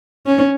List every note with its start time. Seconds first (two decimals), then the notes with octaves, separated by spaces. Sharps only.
0.26 C#4